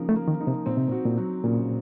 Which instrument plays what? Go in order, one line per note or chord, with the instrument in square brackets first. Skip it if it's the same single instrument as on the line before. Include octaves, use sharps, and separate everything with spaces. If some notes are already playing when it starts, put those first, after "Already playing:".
Already playing: [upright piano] C#3 F3 A#3 D#4
[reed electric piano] A3
[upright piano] A#3
[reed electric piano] D#3
[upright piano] D#4
[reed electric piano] C3
[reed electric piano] A#2 [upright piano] C4
[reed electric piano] C3
A#2
[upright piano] F#4
[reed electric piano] A#2
[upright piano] F#3
[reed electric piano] A#2 [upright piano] C#3